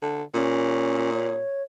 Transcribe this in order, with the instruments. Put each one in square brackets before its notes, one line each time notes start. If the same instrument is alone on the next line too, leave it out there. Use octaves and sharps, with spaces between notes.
[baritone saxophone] D3
[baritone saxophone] A#2 [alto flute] C#4
[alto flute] C#5